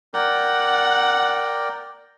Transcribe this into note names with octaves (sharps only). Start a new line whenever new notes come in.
A#4 D5 F#5 G5